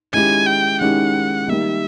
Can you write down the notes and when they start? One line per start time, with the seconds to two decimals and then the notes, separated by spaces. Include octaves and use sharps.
0.13 D#3 G#3 C#4 E4 G4 G#5
0.46 G5
0.81 D#3 G#3 C#4 E4 G4 F#5
1.48 D#3 G3 A#3 E5